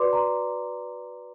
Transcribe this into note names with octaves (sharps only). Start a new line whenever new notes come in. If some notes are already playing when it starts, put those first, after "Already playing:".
Already playing: F#4 B4 D5 C6 D6
A#5 C6